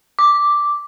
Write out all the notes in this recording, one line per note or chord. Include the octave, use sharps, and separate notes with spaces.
D6